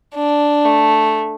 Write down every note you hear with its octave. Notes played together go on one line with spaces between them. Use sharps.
D4
A3